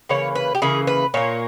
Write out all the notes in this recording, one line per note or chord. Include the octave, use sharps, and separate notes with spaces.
C#3 E3 A#3 C#5
B4
G4
C#3 E3 A#3 G#4
B4
A#2 A#3 C#5